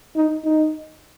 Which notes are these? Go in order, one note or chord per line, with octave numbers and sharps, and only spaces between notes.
D#4
D#4